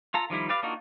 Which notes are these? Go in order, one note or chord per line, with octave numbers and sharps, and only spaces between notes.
F4 A4 A#5
D#3 F3 G3 E4
G4 B4 D5 F5
A#3 D4 D#4 F4 F#4